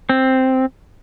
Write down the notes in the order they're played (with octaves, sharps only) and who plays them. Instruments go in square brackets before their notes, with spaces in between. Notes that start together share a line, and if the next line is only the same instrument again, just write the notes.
[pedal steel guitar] C4